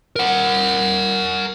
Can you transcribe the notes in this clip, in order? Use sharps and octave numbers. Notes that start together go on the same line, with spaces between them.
A#4 F#5